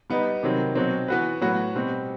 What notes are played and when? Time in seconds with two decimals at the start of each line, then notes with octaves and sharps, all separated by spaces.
0.10 G3 B3 D#4
0.43 C3 D#3 F#3 C4
0.75 B2 F#3 C4
1.08 E3 B3 F#4 B4
1.41 A2 F#3 B3 F#4
1.75 B2 G3 C4